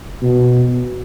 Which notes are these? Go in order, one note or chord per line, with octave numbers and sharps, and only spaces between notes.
B2